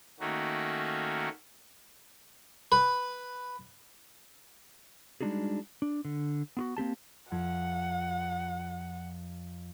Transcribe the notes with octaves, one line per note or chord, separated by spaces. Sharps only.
D#3 A3 A#3 C#4 F#4
B4
G3 G#3 D4 D#4 F#4 G#4
D4
D3
B3 F4 F#4
A#3 C4 G4 A5
F2 F#5 G#6